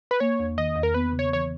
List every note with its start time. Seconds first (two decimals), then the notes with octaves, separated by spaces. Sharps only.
0.11 B4
0.20 A#3 C#5
0.39 E2
0.58 D#3 D#5
0.75 E2
0.83 A#4
0.94 B3 B4
1.12 C#3
1.19 C#5
1.30 E3 C#5